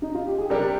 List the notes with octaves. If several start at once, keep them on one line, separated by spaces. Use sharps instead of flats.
D#4
F4
G4
G#4
C3 G3 D4 G4 A#4